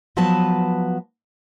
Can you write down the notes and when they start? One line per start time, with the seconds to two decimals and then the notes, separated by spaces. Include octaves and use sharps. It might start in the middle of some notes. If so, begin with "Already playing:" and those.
0.17 F3 F#3 B3 B4 A5